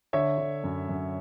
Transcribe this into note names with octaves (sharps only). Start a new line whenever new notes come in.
D3 C#5 E5
D3
F#2
F#2